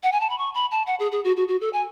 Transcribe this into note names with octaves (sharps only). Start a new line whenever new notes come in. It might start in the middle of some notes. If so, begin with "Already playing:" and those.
F#5
G#5
A5
B5
C#6
B5
A5
F#5
G#4
G#4
F#4
F#4
F#4
A4
G#5